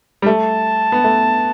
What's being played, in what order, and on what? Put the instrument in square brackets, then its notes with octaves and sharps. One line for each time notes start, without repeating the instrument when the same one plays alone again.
[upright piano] G3
[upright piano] A3 [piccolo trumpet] A5
[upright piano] B3
A3